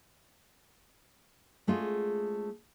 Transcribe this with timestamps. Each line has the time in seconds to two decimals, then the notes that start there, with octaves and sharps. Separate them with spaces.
1.67 G#3 A3 C#4 F4 F#4 G#4